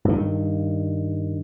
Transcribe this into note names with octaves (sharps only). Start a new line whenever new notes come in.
G2 D#3